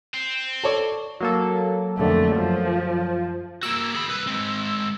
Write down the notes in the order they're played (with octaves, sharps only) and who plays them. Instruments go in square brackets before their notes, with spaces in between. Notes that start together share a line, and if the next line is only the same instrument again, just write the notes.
[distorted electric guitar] C4
[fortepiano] A4 C#5 D5
[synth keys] F#3 A#3 A4
[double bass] F2 D3 [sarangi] A3
[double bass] F#2 [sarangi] F3
[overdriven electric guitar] A#3 F#4 [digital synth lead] E6
[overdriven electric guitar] G#4 B5
C2 B4
G#3 C4